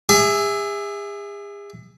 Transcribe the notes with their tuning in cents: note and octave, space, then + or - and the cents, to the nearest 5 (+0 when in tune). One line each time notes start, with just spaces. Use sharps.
G#4 -40 E5 -5 G#5 +0